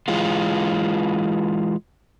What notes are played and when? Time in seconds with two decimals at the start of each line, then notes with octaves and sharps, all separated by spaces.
0.08 E3 G#3 F4